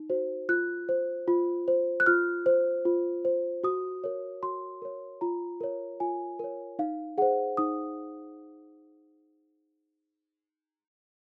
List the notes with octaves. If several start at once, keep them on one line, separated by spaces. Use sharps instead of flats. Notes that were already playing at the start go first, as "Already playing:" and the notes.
Already playing: D#4
F#4 C5
F4 F#6
C5
F4
C5
F#6
F4 F6
C5
F4
C5
F#4 D#6
A#4 C#5
F#4 C6
A#4 C#5
F4 A#5
A#4 C#5
F4 G#5
A#4 C#5
D#4 F5
G#4 C5 F#5
D#4 D#6